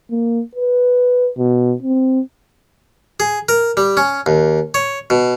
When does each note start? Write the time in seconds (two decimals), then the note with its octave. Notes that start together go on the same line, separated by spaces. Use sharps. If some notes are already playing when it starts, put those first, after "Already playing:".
0.11 A#3
0.55 B4
1.38 B2
1.82 C4
3.20 G#4
3.49 A#4
3.77 G3
3.97 C#4
4.26 D#2
4.74 C#5
5.10 B2